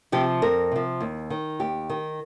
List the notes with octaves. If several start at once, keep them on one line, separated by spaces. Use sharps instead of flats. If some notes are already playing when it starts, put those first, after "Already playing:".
C3 F3 G4
F2 A#4
C3 F3
D#2
D#3
D#2 G4
D#3